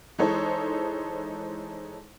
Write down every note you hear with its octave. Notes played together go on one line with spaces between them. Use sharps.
E3 G#3 D#4 A4 C5 C#5